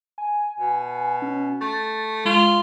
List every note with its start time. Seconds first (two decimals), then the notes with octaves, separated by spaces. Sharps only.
0.18 G#5
0.59 B2
1.22 C#4
1.61 A3 A6
2.25 G#3 F4